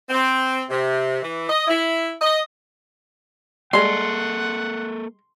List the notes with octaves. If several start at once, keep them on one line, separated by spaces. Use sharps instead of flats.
C4
C3
E3
D#5
E4
D#5
G3 G#3 A#3 A4 F#5 C6